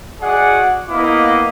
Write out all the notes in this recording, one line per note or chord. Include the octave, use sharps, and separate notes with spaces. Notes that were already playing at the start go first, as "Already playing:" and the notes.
F#4 G#4 D5 D#5 F#5
A#3 B3 E4 D#5 F5 D6